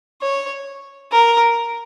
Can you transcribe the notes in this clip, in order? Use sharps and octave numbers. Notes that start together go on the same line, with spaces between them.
C#5
A#4